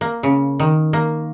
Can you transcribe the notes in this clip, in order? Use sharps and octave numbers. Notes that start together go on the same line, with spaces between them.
A#3
C#3
D#3
A#3